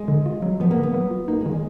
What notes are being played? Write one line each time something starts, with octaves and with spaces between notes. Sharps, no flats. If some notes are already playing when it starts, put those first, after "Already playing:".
Already playing: G#3
D3
F4
F#3
F3 B3
A#3
D3
B3
F#3
F4
A#3 D#4
G#3
D#3
G#3